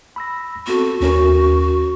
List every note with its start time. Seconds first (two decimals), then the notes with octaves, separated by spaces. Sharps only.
0.16 B5 E6 A#6
0.67 B3 C4 F#4 A4
1.01 D#2 C#4 F#4 A#4